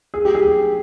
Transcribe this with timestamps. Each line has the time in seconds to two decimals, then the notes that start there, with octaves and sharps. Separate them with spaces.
0.14 G#4
0.25 G4
0.35 G#4